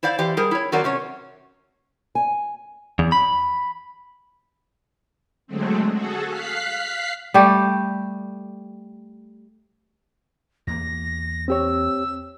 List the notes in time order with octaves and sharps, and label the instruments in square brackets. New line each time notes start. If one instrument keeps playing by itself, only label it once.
[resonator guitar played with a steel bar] E4 C5 D5 F5
E3 G4 C5 D5
G3 G#4 A#4
E4 C#5
D#3 F#3 C4 F#4 A#4 D5
C3 C#4 C#5
[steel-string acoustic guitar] G#5
[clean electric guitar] E2
B5
[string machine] D3 F#3 G#3 A3 C4
F#4 G#4 A4
F5 F#6 B6 C7
[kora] G3 A3 G4
[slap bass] E2 A#3 [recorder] A#6
[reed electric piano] C4 G4 C#5 [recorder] E6